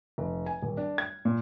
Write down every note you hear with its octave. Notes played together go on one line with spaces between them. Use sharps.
F1
G#5
D#1
D4
G#6
A#2